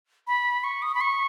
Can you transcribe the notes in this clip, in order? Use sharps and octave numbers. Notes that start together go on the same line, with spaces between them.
B5
C#6
D#6
B5
C#6